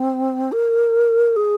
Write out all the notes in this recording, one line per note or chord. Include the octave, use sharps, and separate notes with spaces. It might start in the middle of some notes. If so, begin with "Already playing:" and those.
Already playing: C4
A#4
G#4